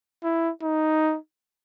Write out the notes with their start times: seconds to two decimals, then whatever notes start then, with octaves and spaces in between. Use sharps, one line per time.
0.24 E4
0.62 D#4